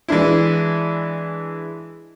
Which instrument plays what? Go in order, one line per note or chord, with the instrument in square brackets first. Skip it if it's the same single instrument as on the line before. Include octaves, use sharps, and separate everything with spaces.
[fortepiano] E3 G#3 D4 E4